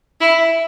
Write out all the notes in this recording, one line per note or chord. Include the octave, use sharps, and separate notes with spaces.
E4